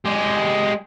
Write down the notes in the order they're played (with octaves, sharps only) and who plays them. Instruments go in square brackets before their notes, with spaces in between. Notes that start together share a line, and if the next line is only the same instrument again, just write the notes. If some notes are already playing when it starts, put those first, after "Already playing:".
[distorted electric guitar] G#3 G4